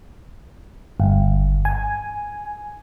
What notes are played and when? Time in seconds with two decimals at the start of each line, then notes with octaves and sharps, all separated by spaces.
1.00 G1
1.65 G#5